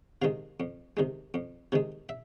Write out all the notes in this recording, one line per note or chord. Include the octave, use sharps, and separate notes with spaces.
C3 D#3 G#3 F5
F2
C3 D#3 G#3
F2
C3 D#3 G#3
E5